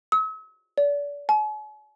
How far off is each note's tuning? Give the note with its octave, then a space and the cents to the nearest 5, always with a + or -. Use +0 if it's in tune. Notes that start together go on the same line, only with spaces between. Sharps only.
E6 -45
D5 -35
G#5 +45